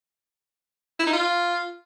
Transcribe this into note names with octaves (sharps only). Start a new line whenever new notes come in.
E4
D#4
F4